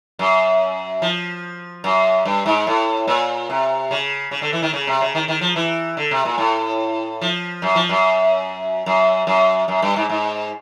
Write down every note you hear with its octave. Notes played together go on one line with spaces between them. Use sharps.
F#2
F3
F#2
G2
G#2
A2
A#2
C3
C#3
C#3
D3
E3
D#3
C#3
C3
C#3
D#3
D#3
F3
E3
D3
C3
A#2
A2
F3
F#2
F3
F#2
F#2
F#2
F#2
G2
G#2
G#2